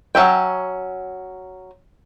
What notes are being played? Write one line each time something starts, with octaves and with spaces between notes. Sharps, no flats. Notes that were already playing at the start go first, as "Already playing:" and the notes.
F#3 C#4 E5 G5